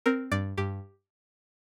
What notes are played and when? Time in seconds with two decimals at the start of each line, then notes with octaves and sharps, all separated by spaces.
0.06 C4 A#4
0.32 G2 D5
0.57 G2 G4